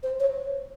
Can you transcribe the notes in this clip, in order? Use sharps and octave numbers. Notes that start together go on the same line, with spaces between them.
C5
C#5